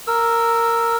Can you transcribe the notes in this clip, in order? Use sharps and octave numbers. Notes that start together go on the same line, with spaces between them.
A#4 E6